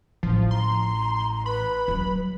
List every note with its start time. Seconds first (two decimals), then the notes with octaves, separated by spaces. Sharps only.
0.23 A1 F3
0.51 A#5 C6
1.46 B4 B5
1.88 F#3 G3